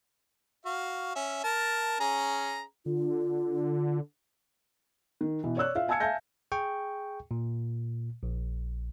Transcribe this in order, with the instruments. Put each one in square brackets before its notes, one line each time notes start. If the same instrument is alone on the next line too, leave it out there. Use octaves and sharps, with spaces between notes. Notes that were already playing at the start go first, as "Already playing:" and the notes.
[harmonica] F#4 F5
C#4 E5
A#4 A5
C#4 G#4 A#5
[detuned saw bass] D3 [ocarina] F4
[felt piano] D#3
B2 E3
C#5 D5 E6 F#6
F4 E5 F5
F5 G#5 A5 E6 G#6 C#7
E5 F5 G#5 A5 G6 A#6
[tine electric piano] G#4 G5 C#6
A#2
A#1